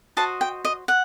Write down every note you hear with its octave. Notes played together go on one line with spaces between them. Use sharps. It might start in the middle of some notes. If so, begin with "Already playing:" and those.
F#4 C5 D#5 A5
G5
D#5
F#5